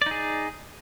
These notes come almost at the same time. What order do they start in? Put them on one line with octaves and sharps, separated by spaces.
D5 D#4 G#4